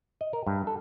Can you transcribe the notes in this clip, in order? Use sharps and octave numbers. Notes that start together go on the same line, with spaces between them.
D#5
A#4
G2
A4